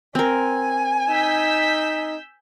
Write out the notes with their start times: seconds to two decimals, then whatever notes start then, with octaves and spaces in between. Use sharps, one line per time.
0.15 C4 A#4 G#5
1.09 D#4 E6 G6 B6